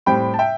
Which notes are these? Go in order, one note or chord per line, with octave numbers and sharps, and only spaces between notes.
A2 G3 C4 G5 B5
A5
E5 G5